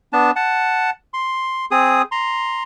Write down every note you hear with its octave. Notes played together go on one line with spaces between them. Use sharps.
B3 D4 A5
F#5 A5
C6
C4 G#4 D#6
A#5 C6